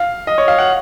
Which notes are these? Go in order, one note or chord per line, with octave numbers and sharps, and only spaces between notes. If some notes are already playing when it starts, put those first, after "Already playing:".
Already playing: F5
D#5
C#5
F5
F#5